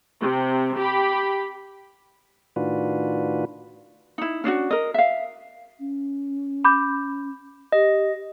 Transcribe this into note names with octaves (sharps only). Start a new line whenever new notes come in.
C3
G4 B5
A2 D#3 D4 F4 F#4 B4
D#4 E4
C#4 D4 E4 F#4
A#4 D#5
E5 F5
C#4
B5 D6 G6
G4 D#5